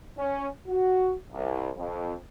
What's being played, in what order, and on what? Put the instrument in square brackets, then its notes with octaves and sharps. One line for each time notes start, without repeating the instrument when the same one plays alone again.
[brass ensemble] C#4
F#4
C2
F2